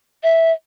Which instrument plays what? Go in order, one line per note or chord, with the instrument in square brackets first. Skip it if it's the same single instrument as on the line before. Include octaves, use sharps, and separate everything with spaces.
[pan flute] E5